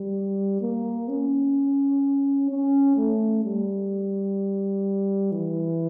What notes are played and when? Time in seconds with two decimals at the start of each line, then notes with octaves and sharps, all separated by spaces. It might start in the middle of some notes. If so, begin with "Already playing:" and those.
Already playing: G3
0.61 A#3
1.09 C#4
2.50 C#4
2.96 A3
3.44 G3
5.32 E3